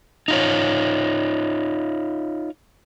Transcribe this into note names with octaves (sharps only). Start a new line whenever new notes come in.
D#4 F4 C#5